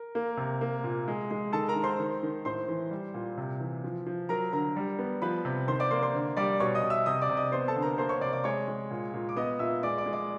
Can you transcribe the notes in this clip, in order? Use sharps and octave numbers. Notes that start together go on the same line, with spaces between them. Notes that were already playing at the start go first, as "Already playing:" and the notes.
Already playing: A#4
A#3
C3
A#3
A#2
G#3
G#3
D#3 A4 A5
A#4 A#5
D#3
C5 C6
D#3
D#3
A2 C5 C6
E3
G3
A#2
C3
E3
F3
F3
F#3 A#4 A#5
D3 A#4 A#5
G3
B3
F3 B4 B5
C3
D#3 C5 C6
D5 D6
A#3 C5 C6
C5 C6
D3
G3 D5 D6
B2 C#5 C#6
D#5 D#6
B2
E5 E6
C3 D#5 D#6
D5 D6
C3
D#5 D#6
B3 C5 C6
A4 A5
D3
A#4 A#5
A#3 C5 C6
C#5 C#6
C3 D5 D6
D5 D6
G#3 C#5 C#6
G#3
A#2
A#2
D6
B3 D#5 D#6
A#2 E5 E6
G#3 D5 D6
D5 D6
G#3
D5 D6